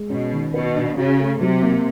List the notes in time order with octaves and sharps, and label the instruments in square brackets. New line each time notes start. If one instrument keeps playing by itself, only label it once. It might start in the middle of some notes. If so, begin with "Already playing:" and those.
Already playing: [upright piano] G#3
[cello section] B2 [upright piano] C#4
[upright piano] D#3
[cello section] B2 [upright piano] B4
[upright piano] D4
[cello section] C#3 [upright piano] F#4
[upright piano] A3
[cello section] C3 [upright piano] F#3
[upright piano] A#3